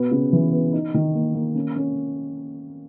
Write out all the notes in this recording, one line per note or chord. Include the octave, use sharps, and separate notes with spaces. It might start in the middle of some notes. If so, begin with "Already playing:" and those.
Already playing: B2 B3
C#3
E3
B3
D#4
D#3
A#3
A#3
C#4
C#4